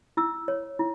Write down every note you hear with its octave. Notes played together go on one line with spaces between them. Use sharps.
E4 E6
C#5
E4